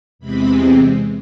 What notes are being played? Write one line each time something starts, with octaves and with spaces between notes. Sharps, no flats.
E2 C3 E3 G#3 C4 B5